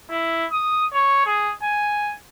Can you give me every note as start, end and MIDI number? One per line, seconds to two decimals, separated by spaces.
0.10 0.46 64
0.52 0.84 87
0.93 1.24 73
1.26 1.51 68
1.63 2.14 80